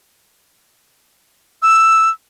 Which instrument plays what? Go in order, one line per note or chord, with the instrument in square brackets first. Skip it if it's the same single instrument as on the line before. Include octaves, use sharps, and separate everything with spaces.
[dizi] E6